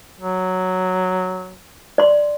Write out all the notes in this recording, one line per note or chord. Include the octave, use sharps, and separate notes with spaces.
F#3
D5 C6